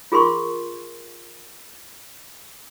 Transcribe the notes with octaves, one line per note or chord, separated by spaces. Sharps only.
F4 G#4 A#4 C6 C#6